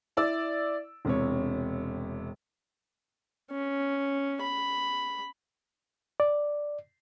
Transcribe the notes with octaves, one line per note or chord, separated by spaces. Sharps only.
E4 D5 E6
E1 C3 C#5
C#4
B5
D5